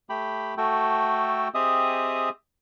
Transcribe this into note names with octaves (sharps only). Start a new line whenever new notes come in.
A3 G4 G5 B5
A3 F#4 A4 G5
C4 G4 G#4 D#5 E5 D#6